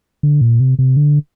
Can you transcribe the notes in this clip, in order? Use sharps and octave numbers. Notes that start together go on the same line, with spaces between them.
D3
A#2
C3
C3
D3